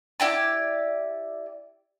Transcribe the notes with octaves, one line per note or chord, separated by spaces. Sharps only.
E4 G4 D5